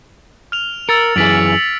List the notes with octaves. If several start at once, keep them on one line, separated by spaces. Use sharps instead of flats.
F6 F7
A#4 E6 A6 C#7
F#2 E3 G#4 B6 D7 F#7